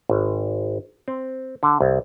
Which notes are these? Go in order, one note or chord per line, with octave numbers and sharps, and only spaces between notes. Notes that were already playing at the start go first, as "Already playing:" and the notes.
G#1
C4
D3
C2